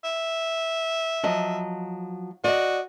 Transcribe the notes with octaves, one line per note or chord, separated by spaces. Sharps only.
E5
F3 F#3 D#5
F#4 D5 D#5